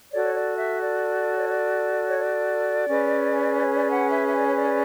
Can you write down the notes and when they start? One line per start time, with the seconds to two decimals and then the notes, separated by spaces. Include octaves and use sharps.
0.11 F#4 A4 C#5 D5
0.24 C#5
0.35 D5
0.57 E5
0.81 D5
1.38 C#5
1.49 D5
2.07 C#5
2.19 D5
2.88 C#4 G#4 B4
3.57 C#5
3.74 D5
3.92 F#5
4.09 E5
4.27 E5
4.37 D5
4.47 C#5
4.57 D5